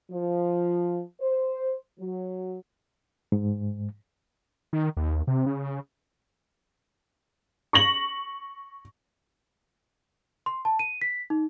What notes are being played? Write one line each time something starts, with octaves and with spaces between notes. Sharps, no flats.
F3
C5
F#3
G#2
D#3
D#2
C3
C#3
C#6 A#6 F#7
C6
A5
D#7
B6
D#4